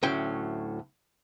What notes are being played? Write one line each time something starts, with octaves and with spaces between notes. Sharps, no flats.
D2 A2 F#3 C#4 G5